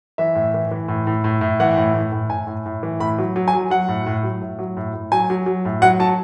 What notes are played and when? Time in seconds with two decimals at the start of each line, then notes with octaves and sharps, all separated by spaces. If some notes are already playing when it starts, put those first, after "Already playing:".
0.18 E3 E5
0.35 A2
0.54 E3
0.71 E3
0.88 A2
1.07 A2
1.24 A2
1.41 A2
1.60 E3 F#5
1.77 A2
1.94 A2
2.12 A2
2.30 A2 G#5
2.47 A2
2.66 A2
2.83 E3
3.00 A2 B5
3.18 F#3
3.36 F#3
3.48 G#5
3.53 F#3
3.70 F#3 F#5
3.88 A2
4.06 A2
4.23 F#3
4.42 A2
4.59 F#3
4.77 A2
4.94 A2
5.12 F#3 G#5
5.30 F#3
5.46 F#3
5.65 A2
5.82 F#3 F#5
6.00 F#3 A5